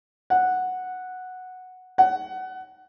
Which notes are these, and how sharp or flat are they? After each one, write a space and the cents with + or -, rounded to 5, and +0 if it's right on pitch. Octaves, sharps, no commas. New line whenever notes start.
F#5 -5
F#5 +20